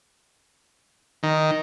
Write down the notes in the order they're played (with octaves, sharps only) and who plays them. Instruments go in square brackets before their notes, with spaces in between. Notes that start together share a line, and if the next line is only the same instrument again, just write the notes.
[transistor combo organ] D#3